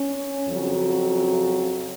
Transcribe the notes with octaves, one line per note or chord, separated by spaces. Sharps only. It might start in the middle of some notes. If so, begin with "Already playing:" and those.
Already playing: C#4
F2 C#3 F#3